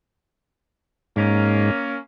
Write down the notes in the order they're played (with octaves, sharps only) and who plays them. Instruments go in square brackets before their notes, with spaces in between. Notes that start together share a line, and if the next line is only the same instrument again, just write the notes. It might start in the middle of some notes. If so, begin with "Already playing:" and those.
[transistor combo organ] G#2 [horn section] A#3 C#4